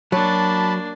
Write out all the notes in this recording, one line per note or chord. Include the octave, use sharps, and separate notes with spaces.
F#3 A#3 D4 A5 B5